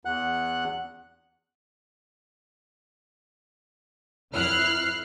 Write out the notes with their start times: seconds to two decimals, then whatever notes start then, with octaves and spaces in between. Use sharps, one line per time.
0.05 E2 F#5 F#6
4.33 F2 E4 F6 F#6 C7